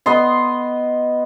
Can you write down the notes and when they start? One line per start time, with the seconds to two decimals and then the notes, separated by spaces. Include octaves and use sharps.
0.06 B3 D#5 C6